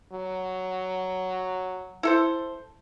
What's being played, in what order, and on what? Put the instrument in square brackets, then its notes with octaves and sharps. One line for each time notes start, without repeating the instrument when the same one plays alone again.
[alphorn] F#3
[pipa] E4 A4 C5